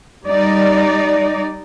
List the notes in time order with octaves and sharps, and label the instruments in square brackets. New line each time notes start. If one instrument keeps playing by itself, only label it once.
[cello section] G3 D#4 D5